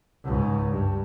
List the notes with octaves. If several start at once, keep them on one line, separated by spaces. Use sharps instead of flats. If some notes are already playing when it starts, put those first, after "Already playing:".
C#2 G#2
G2